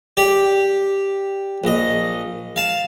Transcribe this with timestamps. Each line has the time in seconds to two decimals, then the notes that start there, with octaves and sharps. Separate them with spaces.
0.17 G4 D5
1.64 A#1 D#5
2.56 F5 A5